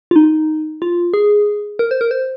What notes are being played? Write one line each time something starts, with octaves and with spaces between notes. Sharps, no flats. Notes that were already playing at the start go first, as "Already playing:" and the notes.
F4
D#4
F4
G#4
A#4
C5
A#4
C5